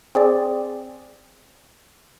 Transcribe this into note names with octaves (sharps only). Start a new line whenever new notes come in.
C4 G#4 D5